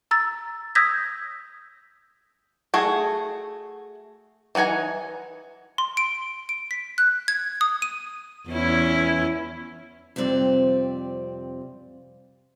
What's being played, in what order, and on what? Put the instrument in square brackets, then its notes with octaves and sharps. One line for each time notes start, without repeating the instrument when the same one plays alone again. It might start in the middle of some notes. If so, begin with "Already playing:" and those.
[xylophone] A#5 E6 A6
D#6 E6 G6 G#6 A#6 B6
[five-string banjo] A3 F#4 G#4
E3 D#4 F#5 G#5 A#5
[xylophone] C6
D7
D7
B6
F#6
G#6
D#6
D#7
[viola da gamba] E2 C#4 E4
[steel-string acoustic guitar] F2 C3 G3 C4 D5